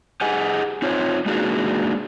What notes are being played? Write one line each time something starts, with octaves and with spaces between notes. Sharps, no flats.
G4 G#4 D#5 F#5 G#5
C4 D#4 F4 C#5
G#3 A#3 D4 D#4 F#4 G#4